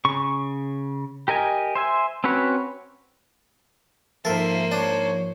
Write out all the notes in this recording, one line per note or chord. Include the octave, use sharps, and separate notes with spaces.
C#3 C#6
G4 A#4 D#5 G#5
C5 E5 G#5
C4 C#4 F#4 B4 C#5
G#2 F3 A#3 A4 A#4 C5 E5
D4 C#5